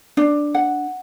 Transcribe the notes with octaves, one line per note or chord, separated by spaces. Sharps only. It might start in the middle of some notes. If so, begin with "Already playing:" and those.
D4
F#5